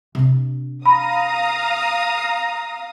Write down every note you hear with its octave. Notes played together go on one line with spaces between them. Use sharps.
C3 D4
F5 A#5 B5 D#6